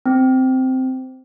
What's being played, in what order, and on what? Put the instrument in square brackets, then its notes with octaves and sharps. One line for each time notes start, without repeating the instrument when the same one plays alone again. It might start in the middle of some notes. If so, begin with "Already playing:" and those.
[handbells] C4